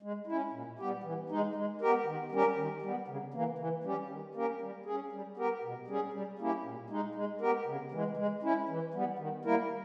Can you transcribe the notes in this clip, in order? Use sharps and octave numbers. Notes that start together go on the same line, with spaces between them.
G#3
C#4 E4
A#2
G3 B3 G4
E3
G#3 D#4
G#3
B3 G4 A#4
D#3
G3 C#4 G4 A#4
D#3
G3 B3
C#3
E3 A#3
E3
G3 C#4 G4
D#3
A#3 C#4 G4 A#4
G3
C#4 G#4
G3
B3 G4 A#4
B2
G3 C#4 G#4
G3
A#3 C#4 E4 G4
A#2
G#3 D#4
G#3
B3 G4 A#4
C#3
E3 G#3
G#3
C#4 E4
E3
G3 B3
D#3
G3 A#3 E4 A#4